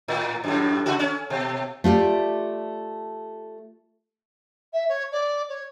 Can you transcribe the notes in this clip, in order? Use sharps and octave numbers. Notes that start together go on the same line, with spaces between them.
A2
F#2 A2
C#3 A3 F#4
C#4
B2
A3 F4 G4 D5
E5
C#5
D5
C#5